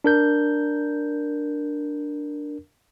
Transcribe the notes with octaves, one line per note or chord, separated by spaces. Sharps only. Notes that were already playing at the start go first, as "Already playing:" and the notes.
D4 A#4 G6